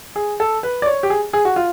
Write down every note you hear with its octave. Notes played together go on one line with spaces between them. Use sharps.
G#4
A4
B4
D5
C#5
G4
G#4
G#4
F#4
F4